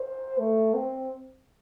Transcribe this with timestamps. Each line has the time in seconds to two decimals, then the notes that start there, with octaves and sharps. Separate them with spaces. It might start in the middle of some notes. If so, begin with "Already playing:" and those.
Already playing: C5
0.38 A3
0.74 C4